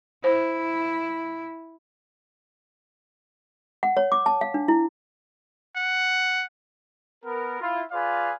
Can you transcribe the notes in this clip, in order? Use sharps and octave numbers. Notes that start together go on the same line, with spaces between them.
E4 C5
F#5
C#5
D6
A5
F5
D4
E4
F#5
B3 A#4
E4 F4
F4 G#4 B4 D5 F5